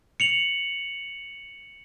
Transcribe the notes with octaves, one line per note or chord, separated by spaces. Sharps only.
C#7 F7 F#7